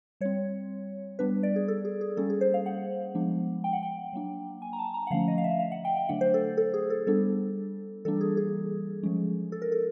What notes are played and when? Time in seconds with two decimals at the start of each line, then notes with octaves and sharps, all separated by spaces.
0.21 G3 C4 C#5
1.19 G3 B3 D4 B4
1.43 D5
1.56 G#4
1.68 A4
1.85 G#4
2.01 G#4
2.17 G3 A#3 C#4 A4
2.30 G#4
2.41 C5
2.54 F5
2.66 F#5
3.15 F3 G#3 B3 D4
3.64 G5
3.73 F#5
3.83 G5
4.13 F#3 A#3 D4
4.62 G#5
4.73 A#5
4.79 A5
4.94 A#5
5.07 F#5
5.11 D3 F3 A3 C#4 F5
5.28 D#5
5.38 F5
5.44 E5
5.59 F5
5.72 F#5
5.85 G5
5.97 G5
6.09 D3 F#3 A3 D4 F#5
6.21 C5
6.34 A4
6.57 A4
6.74 G#4
6.90 A4
7.07 G3 B3 D4 A4
8.05 E3 G3 A#3 D4 A4
8.21 G#4
8.37 G#4
9.03 F3 G#3 C#4
9.52 A4
9.62 A#4
9.72 A4